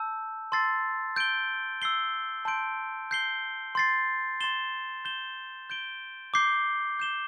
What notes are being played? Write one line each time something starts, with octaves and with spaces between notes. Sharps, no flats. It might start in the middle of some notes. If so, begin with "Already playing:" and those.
Already playing: A5 E6 G6
A5 C6 E6 A6 C7
G6 D7 G7
E6 C7 G7
A5 C6 G6 D7
G6 C7 G7
C6 A6 C7
C6 A6 E7 G7
G6 E7 G7
G6 D7 G7
D6 G6 C7 G7
G6 E7 G7